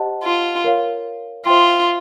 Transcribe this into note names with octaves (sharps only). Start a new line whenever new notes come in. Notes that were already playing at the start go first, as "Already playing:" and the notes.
Already playing: G4 C5 D#5 F#5 A5
F4
A#4 C#5 F5
F4 C5 E5 G5 C6